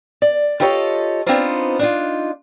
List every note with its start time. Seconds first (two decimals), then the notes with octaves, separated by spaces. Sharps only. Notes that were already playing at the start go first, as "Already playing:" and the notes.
0.22 D5
0.60 F4 G4 A4 A#4 C#5 D#5
1.26 B3 C4 D4 D#4 F4 C5
1.79 D4 D#4 F4